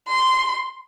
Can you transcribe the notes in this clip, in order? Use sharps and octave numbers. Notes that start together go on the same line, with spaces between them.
C6